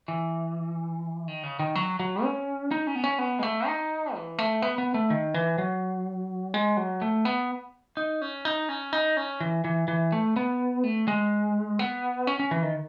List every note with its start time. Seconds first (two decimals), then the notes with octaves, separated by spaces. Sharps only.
0.08 E3
1.28 D#3
1.43 C#3
1.59 D#3
1.75 F#3
2.00 F#3
2.23 C#4
2.71 D#4
2.87 C#4
2.95 B3
3.04 C#4
3.19 B3
3.39 G#3
3.43 A3
3.67 D#4
4.15 E3
4.38 A3
4.62 B3
4.78 B3
4.94 A3
5.10 D#3
5.34 E3
5.58 F#3
6.54 G#3
6.77 F#3
7.02 A3
7.25 B3
7.97 D#4
8.21 C#4
8.45 D#4
8.69 C#4
8.93 D#4
9.17 C#4
9.41 E3
9.64 E3
9.88 E3
10.12 A3
10.36 B3
10.84 A3
11.08 G#3
11.79 B3
12.27 C#4
12.40 C#4
12.51 E3
12.63 D#3